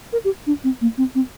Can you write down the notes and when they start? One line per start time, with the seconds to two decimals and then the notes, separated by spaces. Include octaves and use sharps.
0.13 A#4
0.24 G4
0.47 D4
0.64 C4
0.81 A#3
0.98 C4
1.15 C4